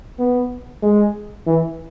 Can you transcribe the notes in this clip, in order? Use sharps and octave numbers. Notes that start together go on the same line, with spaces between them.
B3
G#3
E3